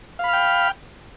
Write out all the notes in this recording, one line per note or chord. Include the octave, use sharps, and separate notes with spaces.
F5 G5 B5 F6